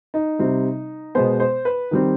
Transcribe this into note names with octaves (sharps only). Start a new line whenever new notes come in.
D#4
C3 G3 C4
B2 G#3 B3 C5
C5
B4
D#3 G3 C4